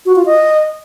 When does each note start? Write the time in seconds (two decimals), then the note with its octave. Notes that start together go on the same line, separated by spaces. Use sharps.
0.06 F#4
0.16 F4
0.26 D#5